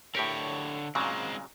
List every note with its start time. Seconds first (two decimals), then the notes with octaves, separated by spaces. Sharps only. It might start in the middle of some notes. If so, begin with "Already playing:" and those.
0.15 A2 D3 G4 A#4 C#5
0.95 A#2 C#3 F#3 G#3 C4